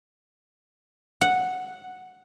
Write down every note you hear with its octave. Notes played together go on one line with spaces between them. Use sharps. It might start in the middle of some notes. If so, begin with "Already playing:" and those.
F#5